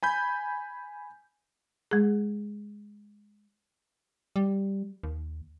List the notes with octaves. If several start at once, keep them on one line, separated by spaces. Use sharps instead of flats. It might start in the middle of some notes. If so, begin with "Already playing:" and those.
G#5 B5 G6
G#3 G#4
G3
D#2